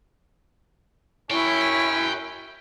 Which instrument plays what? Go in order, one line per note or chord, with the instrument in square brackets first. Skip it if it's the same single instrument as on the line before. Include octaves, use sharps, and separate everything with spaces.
[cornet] C#4 [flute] E4 [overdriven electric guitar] A#4 C#5 [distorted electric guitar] G5